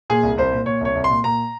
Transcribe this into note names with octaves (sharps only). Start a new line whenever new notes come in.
A#2 G#4
C2
C2 C5
A#2
A#2 C#5
C2 C#5
C2
C6
A#2
A#2 A#5